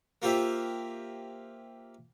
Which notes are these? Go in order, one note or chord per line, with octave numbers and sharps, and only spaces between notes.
A#3 F4 G4 C5 E5